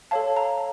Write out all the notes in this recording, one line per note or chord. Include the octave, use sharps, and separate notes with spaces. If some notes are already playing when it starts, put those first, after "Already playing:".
A4 C#5 F5 A5
A#5